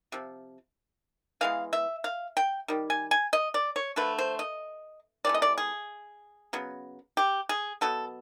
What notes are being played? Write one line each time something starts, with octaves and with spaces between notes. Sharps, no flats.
C3 F3
E3 G#3 B3 F5
E5
F5
G5
D#3 G3
G#5
G#5
D#5
D5
C#5
D3 F3 A3 B4
C5
D#5
C3 E3 A3 D5
D#5
D5
G#4
C#3 F#3 B3
G4
G#4
B2 F#3 B3 A4